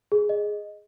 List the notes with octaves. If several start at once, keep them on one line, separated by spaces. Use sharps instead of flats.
G#4
D#5